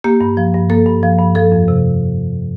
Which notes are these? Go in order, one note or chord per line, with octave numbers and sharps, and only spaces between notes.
A#3 G4
G2
F3
G2
A#3 A4
G2
F3
G2
F3 A4
F2
C3